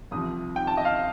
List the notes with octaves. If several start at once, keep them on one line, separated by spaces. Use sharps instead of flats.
C2 C3 F3 D#6
G5
A5
D#5
F5